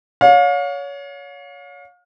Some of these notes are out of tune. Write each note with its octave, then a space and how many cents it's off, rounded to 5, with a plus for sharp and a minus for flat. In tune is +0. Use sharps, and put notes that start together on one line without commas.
C#5 +25 F5 +35